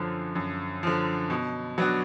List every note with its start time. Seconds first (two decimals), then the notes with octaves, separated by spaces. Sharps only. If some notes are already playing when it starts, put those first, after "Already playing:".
Already playing: F#2 D3 F3
0.35 F#2
0.83 D3 F3
1.30 B2
1.78 F#3 B3 D4 F#4